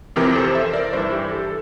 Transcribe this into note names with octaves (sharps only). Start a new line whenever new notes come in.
F2 C3 E3 G4 A#4
A4 C5
C5 E5
A#4 D5
G2 E3 C5 E5
G4
A4